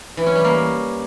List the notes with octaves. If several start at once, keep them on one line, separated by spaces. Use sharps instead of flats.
E3
C#4
G3
A#3